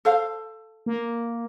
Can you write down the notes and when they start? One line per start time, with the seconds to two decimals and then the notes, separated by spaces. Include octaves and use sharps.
0.05 A4 C5 F5
0.86 A#3